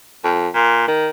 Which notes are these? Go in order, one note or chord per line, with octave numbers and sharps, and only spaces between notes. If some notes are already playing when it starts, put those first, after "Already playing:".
F2
A#2
D#3